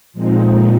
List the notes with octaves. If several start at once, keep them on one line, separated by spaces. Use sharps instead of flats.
A#2 F3 G#3 C4 D#4